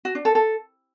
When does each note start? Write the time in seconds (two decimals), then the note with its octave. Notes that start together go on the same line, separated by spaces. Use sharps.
0.05 F#4
0.15 D4
0.25 A4
0.35 A4